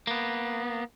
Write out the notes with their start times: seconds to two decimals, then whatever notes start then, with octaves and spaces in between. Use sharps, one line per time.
0.07 A#3 B3